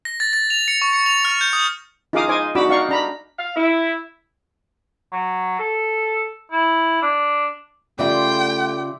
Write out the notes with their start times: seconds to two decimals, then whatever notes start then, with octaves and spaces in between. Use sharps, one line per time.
0.05 A#6
0.20 A6
0.33 A6
0.50 F7
0.68 C#7
0.82 C#6
0.93 C#7
1.06 F7
1.25 F6
1.41 G6
1.53 D#6
2.13 D#4 F4 G#4 F5 D6 D#6
2.28 D#4 C5 D#5 G#5 D6
2.55 D4 D#4 F#4 B5 D6 E6
2.69 D#4 D5 F5 F#5 C#6
2.89 D4 A#5 B5
3.39 F5
3.57 E4
5.12 F#3
5.59 A4
6.52 E4
7.02 D4
7.99 C#3 G3 A3 F4 D5 E5 G5 C6